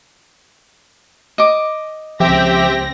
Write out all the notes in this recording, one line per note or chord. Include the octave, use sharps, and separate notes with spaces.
D#5 D6
C#2 F3 C4 G4 E5 G5 A#6